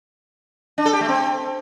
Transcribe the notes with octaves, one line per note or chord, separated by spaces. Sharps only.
D4
A4
G4
A3
C4